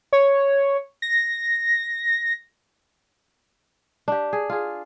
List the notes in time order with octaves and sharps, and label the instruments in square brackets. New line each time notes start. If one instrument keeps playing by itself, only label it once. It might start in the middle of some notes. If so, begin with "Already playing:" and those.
[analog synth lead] C#5
A#6
[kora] D4 G4
G#4
F4 G#4